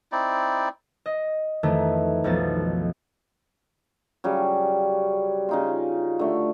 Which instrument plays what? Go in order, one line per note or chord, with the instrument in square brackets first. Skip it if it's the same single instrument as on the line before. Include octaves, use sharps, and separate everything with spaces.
[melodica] C4 D#4 E4 D5
[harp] D#5
F2 D#3 E3 A3
B1 F2 F3 B3 A6
[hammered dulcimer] C#3 F#3 G3
C#3 D#4 F4
D3 A3